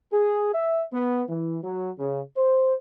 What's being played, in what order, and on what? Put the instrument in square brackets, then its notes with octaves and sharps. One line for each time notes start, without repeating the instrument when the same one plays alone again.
[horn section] G#4
E5
B3
E3
F#3
C#3
C5